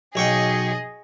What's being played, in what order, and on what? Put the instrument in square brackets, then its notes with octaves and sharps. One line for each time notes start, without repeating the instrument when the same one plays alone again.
[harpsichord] B1 C#5 G5 [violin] G#4 D#5